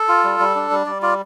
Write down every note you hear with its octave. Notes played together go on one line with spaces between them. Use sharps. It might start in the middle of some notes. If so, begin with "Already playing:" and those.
Already playing: A4
F4
G3
G3
D4
G3
G3 D5
F4 D5